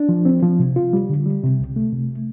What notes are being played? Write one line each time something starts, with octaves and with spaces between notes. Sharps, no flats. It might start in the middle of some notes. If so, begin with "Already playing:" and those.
Already playing: D4
F3
C4
F3
C3
F4
G3
D3
G3
C3
C2
A3
C3